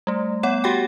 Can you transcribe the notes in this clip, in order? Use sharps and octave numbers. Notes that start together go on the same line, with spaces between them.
G3 A3
B3 C#5 F#5
F#4 G4 F#5 G5